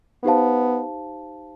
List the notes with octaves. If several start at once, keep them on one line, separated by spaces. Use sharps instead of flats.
B3 D#4 G4 C5 F5 A5